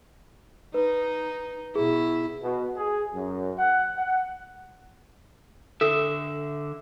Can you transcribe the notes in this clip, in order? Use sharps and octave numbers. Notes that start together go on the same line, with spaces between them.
D#4 B4
B2 E4 G#4
B2
G#4
F#2
F#5
F#5
D3 A4 E5